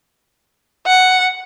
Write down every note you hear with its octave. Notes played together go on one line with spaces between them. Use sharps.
F#5